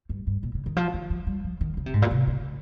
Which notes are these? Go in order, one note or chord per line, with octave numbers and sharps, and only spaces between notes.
G2
G2
A#2
C#3
D#3
F3
D#3
F3
G3
F3
D#3
C#3
C3
G#2
A#2
C3
C#3